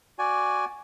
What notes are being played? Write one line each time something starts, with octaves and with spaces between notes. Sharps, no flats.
F#4 D5 G#5